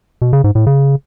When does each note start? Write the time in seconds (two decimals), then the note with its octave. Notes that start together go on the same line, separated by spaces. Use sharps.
0.22 B2
0.33 C#3
0.44 G#2
0.55 A2
0.66 C#3